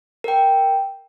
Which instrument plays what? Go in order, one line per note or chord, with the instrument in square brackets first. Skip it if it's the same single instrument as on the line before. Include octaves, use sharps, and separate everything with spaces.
[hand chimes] A#4 G5